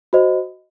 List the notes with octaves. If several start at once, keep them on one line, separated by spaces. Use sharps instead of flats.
F#4 C5 D#5